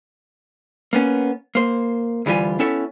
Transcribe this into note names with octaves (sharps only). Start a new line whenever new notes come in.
A#3 B3 C#4
A#3 C5
D2 E3 G3 F4 G#5
B3 C#4 E4 A4 C#5